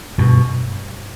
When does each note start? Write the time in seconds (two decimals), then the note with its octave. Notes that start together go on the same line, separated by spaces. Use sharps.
0.18 G2 B2